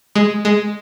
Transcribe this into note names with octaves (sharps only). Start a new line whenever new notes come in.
G#3
G#3